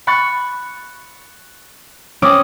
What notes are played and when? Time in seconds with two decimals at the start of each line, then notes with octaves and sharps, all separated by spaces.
0.07 B5 C#6 F#6 A6
2.22 C4 C#4 D6 D#6